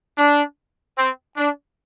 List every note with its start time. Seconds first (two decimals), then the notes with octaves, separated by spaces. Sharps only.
0.17 D4
0.96 C4
1.36 D4